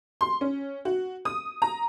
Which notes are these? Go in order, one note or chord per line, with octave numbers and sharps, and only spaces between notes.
C6
C#4
F#4
D#6
A#5